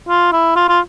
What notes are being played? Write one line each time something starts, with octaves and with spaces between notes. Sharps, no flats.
F4
E4
F4
F4